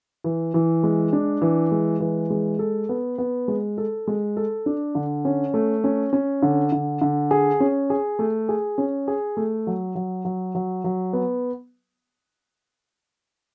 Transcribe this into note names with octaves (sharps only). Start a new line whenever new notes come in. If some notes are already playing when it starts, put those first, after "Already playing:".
E3
E3
G#3
D4
E3
G#3
E3
G#3
A4
B3
B3
G#3
A4
G#3
A4
D4
D3
C#4
A3
C#4
C#4
D3
D3
D3
G#4
C#4
G#4
A3
G#4
C#4
G#4
A3
F#3
F#3
F#3
F#3
F#3
B3